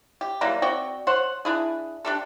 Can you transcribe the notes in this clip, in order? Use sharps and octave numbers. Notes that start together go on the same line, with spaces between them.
G4
E3 F#3 G3 A#3
C4 F#4 D5 G5
C5 C#5 F#5
D4 E4 G#4
D4 G4 A4